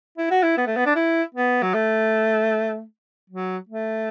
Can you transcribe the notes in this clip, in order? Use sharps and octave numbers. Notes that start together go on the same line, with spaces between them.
E4
F#4
E4
B3
A3
B3
D4
E4
B3
F#3
A3
F#3
A3